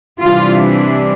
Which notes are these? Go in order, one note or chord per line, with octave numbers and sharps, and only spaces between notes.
C3 E3 G3 D4 F4